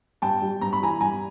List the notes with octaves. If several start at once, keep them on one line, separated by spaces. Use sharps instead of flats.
G2 G5 A5
G3
G2 A#5
B5
E3 G#5 A#5
G2 G#5 A#5